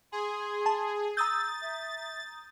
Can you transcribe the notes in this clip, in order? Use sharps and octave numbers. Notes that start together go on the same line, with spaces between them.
G#4 C6
A5
A#5 D#6 E6 G6 A6
E5